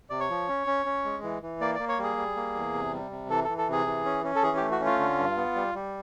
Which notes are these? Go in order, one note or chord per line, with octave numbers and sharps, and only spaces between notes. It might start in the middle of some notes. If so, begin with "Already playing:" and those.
C3 D5
C#5
F3
C#4
C#4
C#4
G#3
E3
E3
A#3 D5
A#3 D5
C#5
G3 G#4
G3
A#3
E2
C3
G3
C3
E3 A4
E3 A4
A4
C3 G#4
E3
C#4
C#4
A4
E3 G#4
A3 G4
F#4
C#4
F4
D3
G2
B3
G3
G3